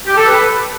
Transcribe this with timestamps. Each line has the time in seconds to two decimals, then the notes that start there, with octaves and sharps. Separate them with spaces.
0.06 G4
0.16 A4
0.26 B4